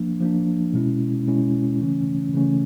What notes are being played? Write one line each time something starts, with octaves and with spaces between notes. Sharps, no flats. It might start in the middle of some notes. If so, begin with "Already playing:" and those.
Already playing: F3 A#3 D4
F3 A#3 D4
B2 G#3 C#4 E4
B2 G#3 C#4 E4
C#3 E3 A3 C#4
C#3 E3 A3 C#4